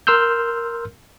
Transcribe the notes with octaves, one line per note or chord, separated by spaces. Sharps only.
A#4 C6 E6 F6 G6